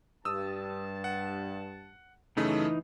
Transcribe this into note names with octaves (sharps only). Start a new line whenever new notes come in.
G2 A5 D#6 E6
F#5
F#2 C#3 E3 A3 D#4